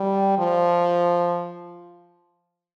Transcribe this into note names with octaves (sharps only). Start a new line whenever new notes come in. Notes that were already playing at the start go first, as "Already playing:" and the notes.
Already playing: G3
F3